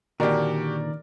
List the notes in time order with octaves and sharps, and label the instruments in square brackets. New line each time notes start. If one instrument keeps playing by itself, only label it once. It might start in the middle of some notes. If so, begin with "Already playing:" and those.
[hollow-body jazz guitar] A#2 D3 [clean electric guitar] D#3 [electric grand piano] F#4 G4 [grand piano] A#4 D5